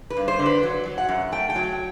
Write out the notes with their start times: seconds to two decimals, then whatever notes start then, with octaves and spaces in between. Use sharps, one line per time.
0.10 B4
0.17 G2
0.28 C5
0.39 D3
0.46 B4
0.63 F#3
0.85 F#3
0.98 F#5
1.09 F#2
1.32 A3 G5
1.50 G5
1.56 F#3